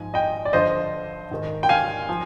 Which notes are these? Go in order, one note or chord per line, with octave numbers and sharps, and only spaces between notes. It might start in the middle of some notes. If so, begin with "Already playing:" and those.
Already playing: G#2 F3 G#5
D#5 G5
D5
G2 D3 F3 C5 D#5
G#2 D#3
G5
F5 G#5
F3